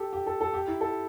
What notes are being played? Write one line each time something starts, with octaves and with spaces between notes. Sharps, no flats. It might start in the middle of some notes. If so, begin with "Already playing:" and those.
Already playing: G4 A4
G4
A4
A4
G4
E4
A4